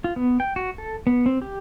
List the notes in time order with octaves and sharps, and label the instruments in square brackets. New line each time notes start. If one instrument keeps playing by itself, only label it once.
[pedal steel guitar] F4
B3
G5
F#4
A4
B3
C4
G4